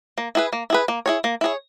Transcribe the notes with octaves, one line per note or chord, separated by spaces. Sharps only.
A#3
E4 G#4 B4
A#3
E4 G#4 B4
A#3
E4 G#4 C#5
A#3
E4 G#4 C#5